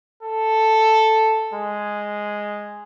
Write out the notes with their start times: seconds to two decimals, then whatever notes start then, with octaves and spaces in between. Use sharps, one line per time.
0.23 A4
1.54 G#3